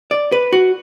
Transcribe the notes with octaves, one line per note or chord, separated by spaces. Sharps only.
D5
B4
F#4